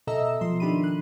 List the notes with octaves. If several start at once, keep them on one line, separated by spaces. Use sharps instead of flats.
B2 A4 D#5 E5 A#5 E6
E6
B2 F3 C6
D#3 D4 G4 B5 D#7
F#6